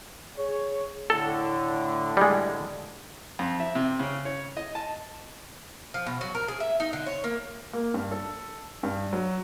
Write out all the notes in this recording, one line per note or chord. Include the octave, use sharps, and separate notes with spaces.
G#4 C#5
A2 D3 A4
G3 G#3
F2
E5
C3
C#3
C#5
D#5
A5
F3
B2
F#3
A#4
G#4
E5
D#4
D3
C#5
A#3
A#3
G2
A4
G2
F#3